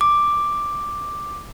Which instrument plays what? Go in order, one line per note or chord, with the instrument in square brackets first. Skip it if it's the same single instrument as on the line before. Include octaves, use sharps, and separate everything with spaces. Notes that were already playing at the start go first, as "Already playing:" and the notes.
[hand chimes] D6